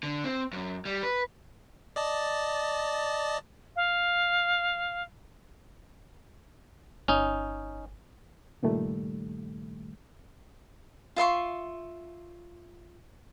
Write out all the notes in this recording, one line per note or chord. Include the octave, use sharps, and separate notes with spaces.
D3
C4
F#2
G3
B4
D5 D#5 A5
F5
G1 C#4 D#4
C#2 G2 A#2 D#3 G3 A3
F4 E5 C6 C#6